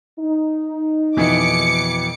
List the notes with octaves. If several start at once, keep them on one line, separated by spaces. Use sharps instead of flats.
D#4
F2 B2 E3 D6 C#7